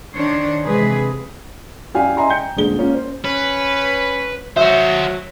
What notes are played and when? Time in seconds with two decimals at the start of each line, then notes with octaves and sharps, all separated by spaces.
0.14 D#3 D4 C5 C#5
0.65 C3 E3 G#3 G#4 B4
1.94 F#2 E4 G4 D5 F5 G#5
2.17 D#5 E5 G#5 A#5 C6
2.29 G5 A#5 G6 C#7
2.56 D#1 A#2 D3 G#3 G7
2.78 A#3 C#4 F4
2.94 C5
3.24 C#4 B4
4.56 F#3 F#4 C5 E5